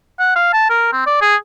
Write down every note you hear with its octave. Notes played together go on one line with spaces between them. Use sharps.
F#5
F5
A5
A#4
C4
D5
G#4